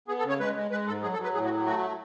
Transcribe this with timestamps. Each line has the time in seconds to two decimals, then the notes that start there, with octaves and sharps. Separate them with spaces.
0.08 B3 G#4
0.19 A4
0.24 C#3
0.29 C#5
0.40 G#3 B4
0.55 G#3
0.71 G#3 B4
0.87 G#2 A4
1.02 F#3 G#4
1.13 A4
1.19 F#3 B4
1.34 A2 G#4
1.45 F#4
1.50 F#3
1.66 A3 F#4